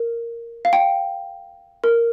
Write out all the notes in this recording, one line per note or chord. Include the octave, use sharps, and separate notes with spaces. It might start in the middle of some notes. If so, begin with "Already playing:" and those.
Already playing: A#4
F5
G5
A#4